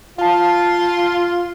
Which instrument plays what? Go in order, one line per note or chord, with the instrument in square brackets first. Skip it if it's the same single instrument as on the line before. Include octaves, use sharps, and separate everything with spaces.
[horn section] F4 [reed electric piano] F5 A5